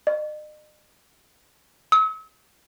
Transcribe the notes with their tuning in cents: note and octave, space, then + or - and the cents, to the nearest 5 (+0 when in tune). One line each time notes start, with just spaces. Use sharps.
D#5 -40
E6 -45